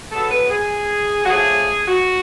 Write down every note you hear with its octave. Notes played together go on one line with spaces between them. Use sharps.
G#2 F#3 B3 A4
B4
G#4
F#4
C#3 F3 A3 D4 G#4
F#4